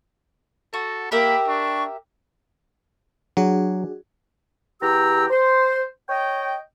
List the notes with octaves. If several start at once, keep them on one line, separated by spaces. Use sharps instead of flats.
F#4 A4
A#3 G4 A#4 E5 B5
D4 C#6
F#3 D4 F#4 G#4
E2 G4 G5 A#5 E6
C5
C#5 D#5 G5